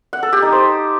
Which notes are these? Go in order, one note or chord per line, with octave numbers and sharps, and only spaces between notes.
F#5
A4
G4
D#4
C5